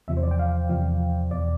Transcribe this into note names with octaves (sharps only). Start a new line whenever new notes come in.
E2 C3 F3 E5
C5
D5
G5
F5
E2 C3 F3 F5
E2 B2 D5